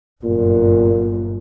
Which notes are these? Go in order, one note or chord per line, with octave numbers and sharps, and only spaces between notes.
G1 F#2 A#2